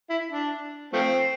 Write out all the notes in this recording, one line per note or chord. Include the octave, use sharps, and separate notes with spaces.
E4
D4
F3 A3 C4